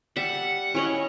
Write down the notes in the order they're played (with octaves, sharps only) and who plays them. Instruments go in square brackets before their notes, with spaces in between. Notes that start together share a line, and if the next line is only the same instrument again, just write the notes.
[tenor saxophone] G3 [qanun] E5 A5 [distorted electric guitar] F#5
[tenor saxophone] C#4 [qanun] E4 C#5 D#5